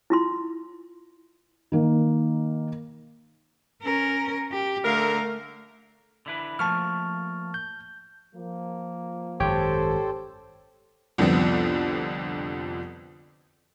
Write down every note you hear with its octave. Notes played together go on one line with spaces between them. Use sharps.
E4 F4 C6
D#3 A#3
C#4 A#4
G4
D3 A3 A#4 F5
D3 E4 B4
F3 A3 A#3 A5 C#6 F6
G6
F3 A#3
G#1 F#2 G4 A4 C5 C#5 G5
C2 F2 D3 F3 B3 C4